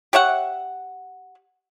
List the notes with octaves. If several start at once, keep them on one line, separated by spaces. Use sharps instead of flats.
G4 C#5 E5 F#5